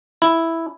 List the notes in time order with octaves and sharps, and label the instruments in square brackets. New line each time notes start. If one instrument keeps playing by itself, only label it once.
[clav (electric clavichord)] E4